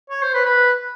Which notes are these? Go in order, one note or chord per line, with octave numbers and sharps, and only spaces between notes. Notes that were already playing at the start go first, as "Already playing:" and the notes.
C#5
C5
B4
B4